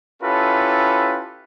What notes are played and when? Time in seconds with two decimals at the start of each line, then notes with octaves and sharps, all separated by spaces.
0.23 C#4 E4 F4 G4 A4 B4